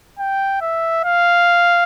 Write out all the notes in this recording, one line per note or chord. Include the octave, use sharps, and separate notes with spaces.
G5
E5
F5